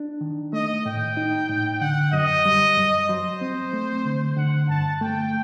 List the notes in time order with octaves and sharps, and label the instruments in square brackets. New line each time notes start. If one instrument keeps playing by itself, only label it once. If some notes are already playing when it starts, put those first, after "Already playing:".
Already playing: [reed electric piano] D4
D#3
[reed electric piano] A3 [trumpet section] D#5
[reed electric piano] A2 [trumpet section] G5
[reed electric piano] D#4
A2
[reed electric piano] D3 [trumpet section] F#5
[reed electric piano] F#2 [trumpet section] D#5
[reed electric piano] G3
F#2
[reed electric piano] F#3 [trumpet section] C5
[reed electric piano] C4
A3
D3
[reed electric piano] D3 [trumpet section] F#5
[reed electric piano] G2 [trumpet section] A5
[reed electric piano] A3 [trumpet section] G5